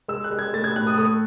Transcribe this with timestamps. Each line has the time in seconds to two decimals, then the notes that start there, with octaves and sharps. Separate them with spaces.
0.08 G#3 E6
0.24 F#6
0.31 G#3
0.39 G#6
0.53 A3 A6
0.64 G#6
0.76 A2 F#6
0.87 D#6
0.98 A3 D#6